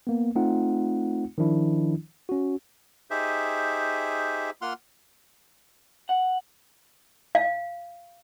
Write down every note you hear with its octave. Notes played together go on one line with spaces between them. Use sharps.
A#3 B3
A3 C4 D#4 F4 F#5
D#3 F3 D4 E4
C#4 F#4
D#4 G4 G#4 C5 E5
A#3 F4 F#5 C6 F6
F#5
F5